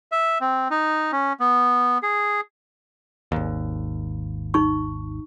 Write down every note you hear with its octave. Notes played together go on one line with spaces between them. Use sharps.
E5
C4
D#4
C#4
B3
G#4
G#1 D#2
D#4 C#6